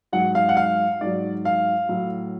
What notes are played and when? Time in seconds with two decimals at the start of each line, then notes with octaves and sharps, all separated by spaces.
0.13 G#2 F#3 F#5
0.35 F5
0.49 F#5
0.57 F5
1.01 G#2 F#3 D5
1.45 F5
1.89 A2 F#3